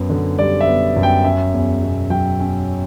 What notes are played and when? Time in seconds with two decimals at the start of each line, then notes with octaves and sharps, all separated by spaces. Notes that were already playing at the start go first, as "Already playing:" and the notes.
Already playing: F#2 B3
0.10 D3
0.38 G3 D5
0.61 E5
0.67 B3
0.96 F#2
1.03 G5
1.24 C#4 E5
1.54 E2
1.83 B2
2.10 F#3 G5
2.40 C#4